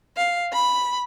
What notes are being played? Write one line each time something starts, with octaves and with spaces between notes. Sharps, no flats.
F5
B5